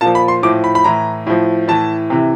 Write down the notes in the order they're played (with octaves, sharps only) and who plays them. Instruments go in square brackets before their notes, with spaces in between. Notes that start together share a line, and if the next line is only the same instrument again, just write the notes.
[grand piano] A#2 F3 A5
B5
C6
A2 F3 D6
B5
B5
A2 E3 A#5
A2 F3
A2 E3 A5
C3 E3